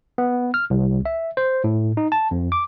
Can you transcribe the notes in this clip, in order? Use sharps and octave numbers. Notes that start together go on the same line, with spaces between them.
B3
F6
C2
E5
C5
A2
D#4
A5
F2
D6